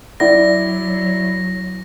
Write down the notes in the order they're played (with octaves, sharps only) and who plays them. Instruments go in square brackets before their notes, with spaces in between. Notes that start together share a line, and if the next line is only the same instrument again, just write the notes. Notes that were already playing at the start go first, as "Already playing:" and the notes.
[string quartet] F#3 [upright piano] E4 D5 [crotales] A#6